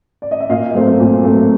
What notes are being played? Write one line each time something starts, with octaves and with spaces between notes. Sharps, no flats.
D5
D#5
E5
A#2 D#5 F5
F#3 A3 C4
A#2
F#3 A3 C4